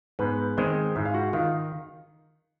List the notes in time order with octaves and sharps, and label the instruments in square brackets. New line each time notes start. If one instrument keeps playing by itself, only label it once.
[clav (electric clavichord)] G#2 [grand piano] B3 B4
[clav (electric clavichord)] D#3 G#3 [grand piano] C4 C5
[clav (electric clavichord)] G#2 [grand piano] E4 E5
[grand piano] F5
F#4 F#5
[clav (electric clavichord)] D#3 [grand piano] F4 F5